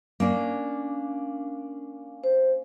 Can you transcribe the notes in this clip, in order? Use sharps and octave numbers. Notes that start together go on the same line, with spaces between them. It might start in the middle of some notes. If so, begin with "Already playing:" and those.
A#3 C#4 D4
C5